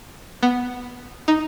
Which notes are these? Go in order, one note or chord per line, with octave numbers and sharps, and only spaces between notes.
B3
D#4